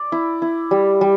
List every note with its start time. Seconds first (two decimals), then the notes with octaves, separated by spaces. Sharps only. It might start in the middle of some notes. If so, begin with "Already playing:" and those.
Already playing: D5
0.12 E4
0.42 E4
0.71 G3
1.01 G3